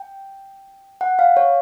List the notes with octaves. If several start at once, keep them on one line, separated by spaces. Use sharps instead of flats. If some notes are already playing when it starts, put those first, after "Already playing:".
Already playing: G5
F#5
F5
C#5